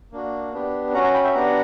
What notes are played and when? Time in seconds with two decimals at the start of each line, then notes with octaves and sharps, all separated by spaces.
0.12 A#3 D4 F#4
0.53 B3 D4 G4
0.94 C#4 F#4 F#5 A#5
1.04 F#5 A#5
1.14 G5 B5
1.24 E5 G5
1.35 B3 D4 G4 F#5 A#5